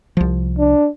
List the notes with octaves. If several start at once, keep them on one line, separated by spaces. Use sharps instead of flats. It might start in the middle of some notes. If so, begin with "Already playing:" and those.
C2 F3
D4